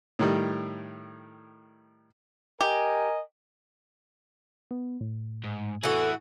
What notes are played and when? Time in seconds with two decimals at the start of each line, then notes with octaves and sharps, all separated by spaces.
0.19 A2 D#3 G3
2.61 G4 A#4 D#5 G#5
4.71 B3
5.01 A2
5.44 G#2
5.83 E3 E4 F#4 G#4 A4